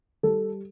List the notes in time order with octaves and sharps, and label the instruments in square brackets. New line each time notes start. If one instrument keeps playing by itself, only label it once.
[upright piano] G3 A4